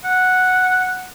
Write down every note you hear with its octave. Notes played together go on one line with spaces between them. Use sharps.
F#5